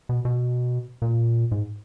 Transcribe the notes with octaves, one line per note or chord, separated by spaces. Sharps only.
B2
B2
A#2
G#2